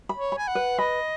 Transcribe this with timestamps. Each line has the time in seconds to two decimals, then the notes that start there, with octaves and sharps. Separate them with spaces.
0.09 B5
0.17 C#5
0.32 B5
0.38 G#5
0.48 F#5
0.55 B4
0.79 D#5 B5